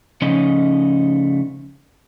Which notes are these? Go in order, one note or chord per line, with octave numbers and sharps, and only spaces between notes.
C#3 F3 A3 C#4 D#4 D#5